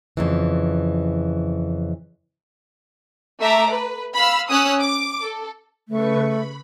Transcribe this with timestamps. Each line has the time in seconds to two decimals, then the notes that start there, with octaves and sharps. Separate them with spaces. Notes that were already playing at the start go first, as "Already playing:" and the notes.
0.17 F2 C#3 E3
3.40 A3 E5 A#5 D6
3.73 B4
4.15 F5 B5 E6
4.50 C#4 D#6 E6 F#6
4.80 D6
5.22 A4
5.89 C#3 A3 B4 C#6
6.22 B5